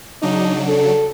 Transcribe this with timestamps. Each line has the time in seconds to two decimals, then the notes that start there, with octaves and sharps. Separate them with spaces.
0.22 C#3 F#3 D4 D#4
0.68 A4